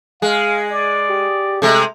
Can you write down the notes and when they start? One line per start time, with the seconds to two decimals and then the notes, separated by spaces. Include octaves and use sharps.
0.22 G#3 G#4 F5
0.69 D5
1.09 G4
1.62 C3 G#3 A3